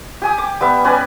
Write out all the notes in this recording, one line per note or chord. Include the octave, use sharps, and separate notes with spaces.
G4 G#5 D#6
D6
G3 B3 E5
C#4 B4 D5 G#5